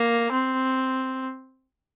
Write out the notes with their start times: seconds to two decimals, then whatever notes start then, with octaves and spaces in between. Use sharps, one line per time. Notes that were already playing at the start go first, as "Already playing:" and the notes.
Already playing: A#3
0.32 C4